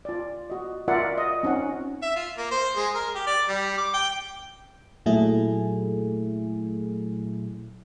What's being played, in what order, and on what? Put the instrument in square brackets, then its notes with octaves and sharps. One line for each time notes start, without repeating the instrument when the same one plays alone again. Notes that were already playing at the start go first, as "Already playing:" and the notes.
[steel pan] F4 D5
F#4 D#5
F4 A#4 D5 E5 F#5
D#5
C4 C#4 D#4 F#5
[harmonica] E5
F4
A#3
C5
G#3
A#4
G4
D5
G3
D6
G5
[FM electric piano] A#2 F#3 A3 E4 G#4